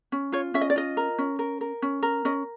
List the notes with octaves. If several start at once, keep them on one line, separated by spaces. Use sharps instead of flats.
C#4
F4 C#5
C#4 E5
D#5
D5
F4 D#5
A#4
C#4
A#4
A#4
C#4
A#4
C#4 D#5